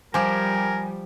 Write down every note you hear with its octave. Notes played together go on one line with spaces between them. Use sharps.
F3 G3 G4 A#4 G#5